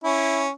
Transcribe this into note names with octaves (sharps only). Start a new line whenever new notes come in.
C#4 E4